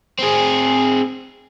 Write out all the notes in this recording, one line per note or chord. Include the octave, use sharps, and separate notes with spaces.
C4 G#4